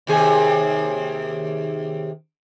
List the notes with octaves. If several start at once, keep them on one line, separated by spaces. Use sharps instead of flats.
D#2 C3 G#4